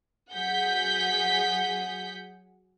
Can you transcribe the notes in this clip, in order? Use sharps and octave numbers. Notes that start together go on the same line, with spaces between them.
F#3 G#4 F#5 G6 B6